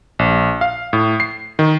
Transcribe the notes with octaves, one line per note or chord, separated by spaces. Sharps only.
A#1
F5
A2
C7
D#3